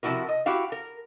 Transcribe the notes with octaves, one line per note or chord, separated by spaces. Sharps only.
C3 F3 D#4 E4 F#4 A#4
D#5
E4 F#4 G4 F5
A#4